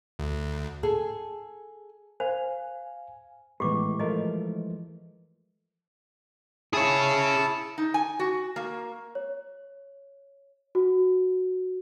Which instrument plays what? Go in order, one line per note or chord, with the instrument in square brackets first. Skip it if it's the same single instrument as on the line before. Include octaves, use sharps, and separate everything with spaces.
[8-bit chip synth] D2
[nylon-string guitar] G#4 A4 G#5
[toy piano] C5 [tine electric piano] F5 G#5
[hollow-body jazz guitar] A2 B3 [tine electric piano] E3 G#3 [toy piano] G4 D6
[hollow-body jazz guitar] F3 A3 A#4 [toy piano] D#5
[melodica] E4 A5 [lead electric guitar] G#4 C#5
[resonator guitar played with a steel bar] D#4
G#5
F#4
A#3
[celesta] C#5
F#4